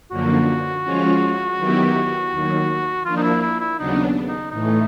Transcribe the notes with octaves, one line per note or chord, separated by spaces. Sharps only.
F#2 D3 F3 A#3 F#4
F3 G#3 C#4 F4
D#3 F#3 B3 E4 G4
D#2 D#3 F#3
F3 A#3 D4 F4
D#4
E4
E4
E4
D#2 C#3 F#3 B3 D4 D#4
D#4
A2 E3 A3 D#4